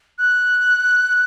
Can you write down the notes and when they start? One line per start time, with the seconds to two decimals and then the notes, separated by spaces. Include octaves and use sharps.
0.19 F#6